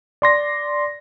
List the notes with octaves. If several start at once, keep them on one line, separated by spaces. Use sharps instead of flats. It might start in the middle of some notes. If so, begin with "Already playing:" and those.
D5 C6 A#6